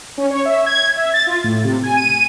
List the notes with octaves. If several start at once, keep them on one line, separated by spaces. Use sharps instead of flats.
C#4
C#5
E5
G#6
E5
A6
F4
A2
C3
G#5
D#7